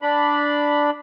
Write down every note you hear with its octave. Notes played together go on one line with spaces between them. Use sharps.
D4 B5